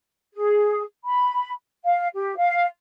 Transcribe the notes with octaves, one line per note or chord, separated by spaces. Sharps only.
G#4
B5
F5
G4
F5